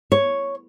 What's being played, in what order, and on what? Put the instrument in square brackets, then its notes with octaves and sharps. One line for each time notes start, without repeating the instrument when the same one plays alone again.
[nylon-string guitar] C#5